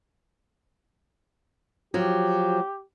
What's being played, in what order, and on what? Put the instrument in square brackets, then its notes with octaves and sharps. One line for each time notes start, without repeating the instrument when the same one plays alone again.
[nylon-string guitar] F3 F#3 [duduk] G4